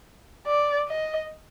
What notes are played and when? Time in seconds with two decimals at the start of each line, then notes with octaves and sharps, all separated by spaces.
0.47 D5
0.88 D#5